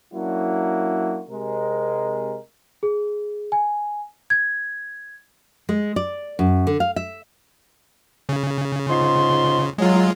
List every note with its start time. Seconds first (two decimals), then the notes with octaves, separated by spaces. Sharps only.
0.14 F#3 A#3 C#4 D4 E4 F#4
1.30 C3 G#3 A#4
2.83 G#4
3.52 G#5
4.30 G#6
5.69 G#3
5.96 D5
6.39 F#2
6.67 D3
6.80 F5
6.96 E5
8.29 C#3
8.89 G#2 F4 C6
9.78 F#3 G#3 F4